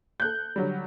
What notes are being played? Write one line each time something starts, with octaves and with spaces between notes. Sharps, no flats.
A4 F#6 G6
D3 F#3 G3